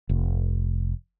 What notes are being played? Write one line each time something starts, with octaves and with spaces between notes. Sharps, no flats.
F1